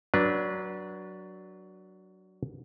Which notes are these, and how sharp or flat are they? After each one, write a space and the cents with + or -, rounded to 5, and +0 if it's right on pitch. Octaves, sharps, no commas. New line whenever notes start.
F#3 +10 D4 -5 B4 -25